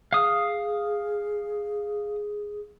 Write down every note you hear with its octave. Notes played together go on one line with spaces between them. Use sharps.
G#4 F5 D#6